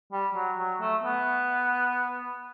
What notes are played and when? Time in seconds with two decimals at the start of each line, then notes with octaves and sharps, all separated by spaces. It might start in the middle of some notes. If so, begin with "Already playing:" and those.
0.12 G3
0.35 F#3
0.58 F#3
0.81 A3
1.03 B3